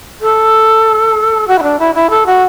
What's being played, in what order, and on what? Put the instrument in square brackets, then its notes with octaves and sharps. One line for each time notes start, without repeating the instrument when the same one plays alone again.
[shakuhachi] A4
F#4
E4
D4
E4
E4
A4
F#4